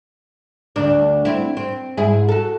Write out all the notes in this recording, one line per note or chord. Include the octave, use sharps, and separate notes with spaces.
D2 D4
C4 E4
C4
G#2 E4 G#4
F#4 A4